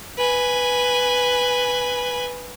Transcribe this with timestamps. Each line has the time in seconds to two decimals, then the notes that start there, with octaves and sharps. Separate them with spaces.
0.17 B4 G#5